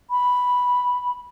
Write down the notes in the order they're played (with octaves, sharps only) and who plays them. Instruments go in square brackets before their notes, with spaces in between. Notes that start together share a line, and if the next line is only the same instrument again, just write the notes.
[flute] B5